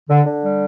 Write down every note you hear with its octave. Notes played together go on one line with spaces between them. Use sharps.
D3
D3
G3